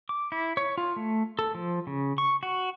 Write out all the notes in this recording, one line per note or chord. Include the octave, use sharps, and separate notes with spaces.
D6
E4
C#5
F4
A3
A4
F3
C#3
C#6
F#4